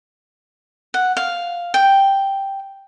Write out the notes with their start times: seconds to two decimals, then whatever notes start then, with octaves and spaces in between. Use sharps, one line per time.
0.94 F#5
1.17 F5
1.74 G5